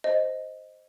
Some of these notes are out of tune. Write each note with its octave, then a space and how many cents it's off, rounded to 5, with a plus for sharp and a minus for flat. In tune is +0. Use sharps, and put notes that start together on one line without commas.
C5 +0 D#5 +0